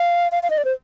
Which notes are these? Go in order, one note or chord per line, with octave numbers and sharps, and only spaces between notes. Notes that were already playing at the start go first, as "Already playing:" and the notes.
Already playing: F5
F5
F5
D#5
D5
C5